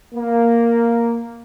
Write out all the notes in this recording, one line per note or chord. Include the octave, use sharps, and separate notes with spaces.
A#3